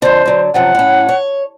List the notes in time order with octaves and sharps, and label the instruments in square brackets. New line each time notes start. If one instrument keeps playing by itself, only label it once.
[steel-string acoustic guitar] F2 D3 [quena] C5
[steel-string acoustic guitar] D3 F#3
[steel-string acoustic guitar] F#2 C3 F3 [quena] F#5
[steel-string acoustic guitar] A2 C#4
C#5